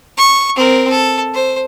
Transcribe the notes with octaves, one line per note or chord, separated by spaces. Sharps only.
C#6
C4 A#4
A4
C5